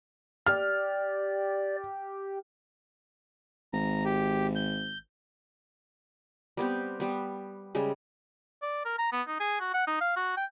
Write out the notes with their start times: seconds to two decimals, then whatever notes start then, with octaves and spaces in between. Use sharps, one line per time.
0.46 G4 D5 F6
3.73 G#1 A#5
4.05 G4
4.56 G6
6.57 G3 B3 C4 G4
7.00 G3 B3
7.75 C#3 G3 G#3
8.62 D5
8.85 A#4
8.99 A#5
9.12 B3
9.27 D#4
9.40 G#4
9.60 F#4
9.74 F#5
9.87 D#4
10.01 F5
10.16 F#4
10.37 G5